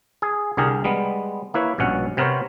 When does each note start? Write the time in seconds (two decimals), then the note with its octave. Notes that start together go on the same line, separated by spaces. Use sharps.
0.22 G#4
0.57 C2 D3 G4 G#4 A#4
0.84 G3 G#3 B3
1.54 A#3 E4 B4 C#5
1.78 A#1 G2 B2 C#4 F#5
2.17 C3 B3 A#4 C5 C#5